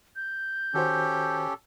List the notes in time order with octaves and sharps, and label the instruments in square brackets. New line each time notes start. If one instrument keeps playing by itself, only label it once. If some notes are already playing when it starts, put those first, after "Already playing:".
[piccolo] G6
[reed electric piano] D#3 F#4 C5 [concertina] C#4 G4 [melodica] A4